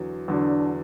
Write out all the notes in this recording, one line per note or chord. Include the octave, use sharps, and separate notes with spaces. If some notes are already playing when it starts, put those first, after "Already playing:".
Already playing: E2 D3 F#3
E2 D3 F#3 D4